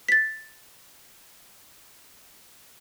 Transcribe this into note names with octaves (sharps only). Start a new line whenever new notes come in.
A6 B6